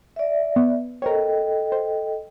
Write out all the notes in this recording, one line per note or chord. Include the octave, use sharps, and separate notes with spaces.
D5 E5
B3
A4 A#4 C5 C#5 D#5 G5
C5